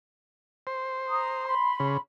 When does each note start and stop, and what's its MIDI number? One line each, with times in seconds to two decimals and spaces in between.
0.67 1.55 72
1.09 1.45 82
1.09 1.45 87
1.46 1.98 83
1.46 1.98 84
1.80 1.97 49